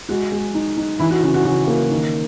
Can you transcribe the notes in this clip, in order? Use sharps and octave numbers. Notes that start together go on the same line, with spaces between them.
G#3 F#4
G#3
D#4
D#4
E3 E4
F#4
C#3 F#4
F#4
C#3 F#4
A#3
D#3